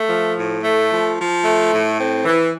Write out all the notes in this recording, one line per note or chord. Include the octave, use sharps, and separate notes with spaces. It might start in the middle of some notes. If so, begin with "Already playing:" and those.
Already playing: A3
F3
A2
A3
F3
F3
A3
A2
C4
E3